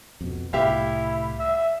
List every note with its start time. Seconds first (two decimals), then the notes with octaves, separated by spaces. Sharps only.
0.21 F2 B2
0.53 C2 A2 E4 G4 E5 F5
1.39 E5